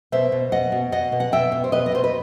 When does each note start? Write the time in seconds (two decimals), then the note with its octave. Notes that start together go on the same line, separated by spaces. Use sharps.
0.12 B2 C5 E5
0.32 B2
0.52 B2 D#5 F#5
0.72 B2
0.92 B2 D#5 F#5
1.12 B2
1.20 F#5
1.32 B2 E5 G5
1.52 B2
1.64 C5
1.72 B2 B4 D#5
1.86 D#5
1.92 B2 C5
2.04 B4